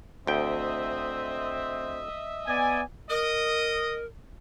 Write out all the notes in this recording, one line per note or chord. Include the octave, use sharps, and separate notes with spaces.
D2 C4 D#5 E5 G5
B3 D5 G#5
A#4 D#5